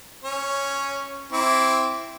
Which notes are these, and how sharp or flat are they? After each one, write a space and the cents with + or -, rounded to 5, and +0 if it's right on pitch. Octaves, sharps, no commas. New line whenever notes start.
C#4 -5 C#5 +0
C4 +0 E4 +0 D6 -20